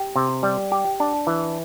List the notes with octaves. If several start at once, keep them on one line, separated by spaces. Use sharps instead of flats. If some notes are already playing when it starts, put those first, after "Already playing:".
Already playing: G4
C3
G3
G4
D4
E3